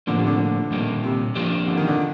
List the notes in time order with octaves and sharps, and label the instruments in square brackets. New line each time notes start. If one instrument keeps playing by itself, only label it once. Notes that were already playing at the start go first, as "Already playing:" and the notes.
[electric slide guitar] A2 F3 A#3 [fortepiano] D3
[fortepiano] C3
D3
[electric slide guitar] A#2 G3 A#3
[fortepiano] C3
[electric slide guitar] F3 A#3 D4 G4
[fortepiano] D3
D#3
D3